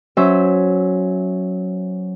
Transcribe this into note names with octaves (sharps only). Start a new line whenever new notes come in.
F#3 C#4 C5 E5